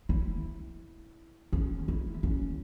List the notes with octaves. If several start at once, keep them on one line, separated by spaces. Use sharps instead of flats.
E4
C#4
E4
C#4